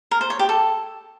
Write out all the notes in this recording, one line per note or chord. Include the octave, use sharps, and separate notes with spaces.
A#4
C5
C#5
G4
A4